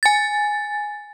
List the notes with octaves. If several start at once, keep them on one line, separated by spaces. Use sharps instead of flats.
G#5 A6